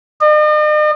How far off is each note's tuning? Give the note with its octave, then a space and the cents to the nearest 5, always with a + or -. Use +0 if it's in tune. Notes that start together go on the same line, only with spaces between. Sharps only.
D#5 -45